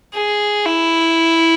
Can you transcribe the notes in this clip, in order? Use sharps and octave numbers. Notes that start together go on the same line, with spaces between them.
G#4
E4